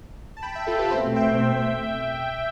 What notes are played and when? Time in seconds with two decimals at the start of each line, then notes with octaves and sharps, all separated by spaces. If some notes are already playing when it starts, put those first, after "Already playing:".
0.37 A5
0.42 G5 B5
0.55 E5 G5
0.67 F4 A4
0.79 G4 B4
0.91 B2 A3 C4 C5 E5
1.16 E5 G5